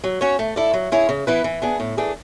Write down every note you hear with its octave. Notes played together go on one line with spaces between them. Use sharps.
F#3
C#4 F#4 C#5
A3
E4 A4 D5
F#3
C#4 E4 G#4 C#5
C#3
E3 B3 E4 B4
E3
B3 D4 G#4
A2
E3 A3 D4 G#4